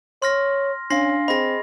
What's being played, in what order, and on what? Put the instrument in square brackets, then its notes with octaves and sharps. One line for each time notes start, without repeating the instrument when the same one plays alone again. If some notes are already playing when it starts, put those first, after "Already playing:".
[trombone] C#5 [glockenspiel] C6 F6 A#6
[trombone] C#4 [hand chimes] D4 F5 [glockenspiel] C6 A#6 C7
[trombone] C4 [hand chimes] G#4 D#5 [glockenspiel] B5 A#6